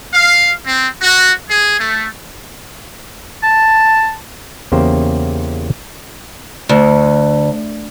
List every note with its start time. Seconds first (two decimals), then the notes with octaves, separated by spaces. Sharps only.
0.14 F5
0.66 C4
1.02 F#4
1.48 G#4
1.79 A3
3.43 A5
4.72 E2 C#3 A#3 G4 C5
6.69 D2